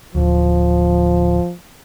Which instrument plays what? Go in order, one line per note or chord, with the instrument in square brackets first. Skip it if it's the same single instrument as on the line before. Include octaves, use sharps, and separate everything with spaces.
[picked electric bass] D1 D2 [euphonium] F3